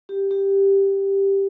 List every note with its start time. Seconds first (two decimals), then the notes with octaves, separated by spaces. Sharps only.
0.09 G4
0.31 G4